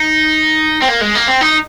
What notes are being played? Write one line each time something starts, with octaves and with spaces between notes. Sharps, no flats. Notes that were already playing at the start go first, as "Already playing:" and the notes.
Already playing: D#4
C4
A#3
G#3
A#3
C4
D#4